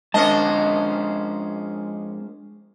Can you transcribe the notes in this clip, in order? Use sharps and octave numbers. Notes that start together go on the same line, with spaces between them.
F2 G#3 C#4 D4 A#4 C5 D#5 A5